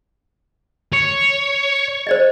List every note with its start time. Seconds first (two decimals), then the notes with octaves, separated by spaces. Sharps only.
0.93 C#5
2.07 C5 D5 D#5